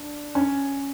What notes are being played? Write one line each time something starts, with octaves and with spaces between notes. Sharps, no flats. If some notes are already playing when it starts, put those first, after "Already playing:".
Already playing: D4
C#4